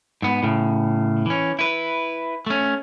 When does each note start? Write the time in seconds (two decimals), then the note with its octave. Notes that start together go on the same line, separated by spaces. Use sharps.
0.22 G#2 B3
0.43 A2 C#3
1.26 E3 C#4
1.59 E4 B4
2.46 A3 C#4